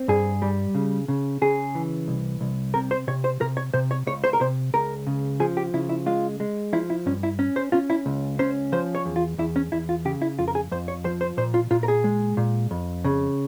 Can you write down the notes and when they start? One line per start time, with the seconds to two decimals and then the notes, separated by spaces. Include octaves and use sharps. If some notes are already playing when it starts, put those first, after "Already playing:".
Already playing: C4
0.08 G2 G#4
0.42 G3
0.75 C#3
1.08 C#3
1.42 C#3 G#4
1.75 E3
2.08 C2
2.41 C2
2.74 C3 A#4
2.91 C5
3.07 C3 C#5
3.24 C5
3.41 C3 A#4
3.57 C#5
3.74 C3 C5
3.91 C#5
4.07 C#2 C#5
4.24 C5
4.33 A#4
4.41 C3 C5
4.74 C#2 A#4
5.07 C#3
5.40 F3 G#4
5.57 G4
5.74 C#3 E4
5.89 E4
6.06 G#3 F4
6.40 G#3
6.73 F3 E4
6.90 E4
7.06 G2 C#4
7.23 E4
7.39 C#4
7.56 C5
7.72 C#4 F4
7.90 E4
8.06 C#2
8.39 C#4 C5
8.72 F3 C5
8.95 C#5
9.05 E2
9.16 F4
9.38 E2 E4
9.56 C#4
9.72 E2 E4
9.89 F4
10.05 C#3 G4
10.22 E4
10.39 F2 F4
10.48 A#4
10.55 G#4
10.71 F2 C5
10.88 C#5
11.05 F3 C5
11.21 C5
11.37 A#2 C5
11.54 F4
11.71 A#2 F4
11.83 A#4
11.88 G#4
12.04 G#3
12.37 A#2
12.71 F2
13.05 C#3